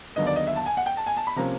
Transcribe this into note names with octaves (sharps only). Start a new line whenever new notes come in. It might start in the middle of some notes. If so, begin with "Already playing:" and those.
D#2 D3 F#3 B3 D#5
D5
D#5
E5
A5
G#5
F#5
G5
A5
G#5
A5
B5
C3 F3 A#3 C#4 A#5